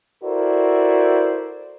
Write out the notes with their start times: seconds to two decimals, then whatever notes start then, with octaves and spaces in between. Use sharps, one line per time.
0.24 E4 F#4 A4 A#4 C5 D5